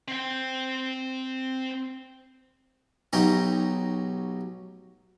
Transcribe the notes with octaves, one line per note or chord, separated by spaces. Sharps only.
C4 G5
B1 F#3 D#4 G4 A#5